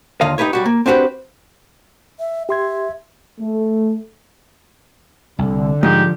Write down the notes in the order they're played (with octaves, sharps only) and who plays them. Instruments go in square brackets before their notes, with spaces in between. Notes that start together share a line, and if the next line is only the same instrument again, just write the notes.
[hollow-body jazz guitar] D#2 D3 F4 D#5 F5
D#4 E4 G4 B4 C#5
B1 G3 F#4
A#3
C4 D4 F#4 G4 B4
[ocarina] E5
[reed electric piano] G4 C6 G#6 [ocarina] E5
[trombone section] A3
[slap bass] C2 [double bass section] D3
[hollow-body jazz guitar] G#2 [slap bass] F3 [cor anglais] G4